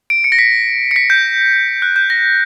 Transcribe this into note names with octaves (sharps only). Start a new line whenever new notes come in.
D7
C#7
A#6
B6
C#7
B6
G6
F#6
G6
A#6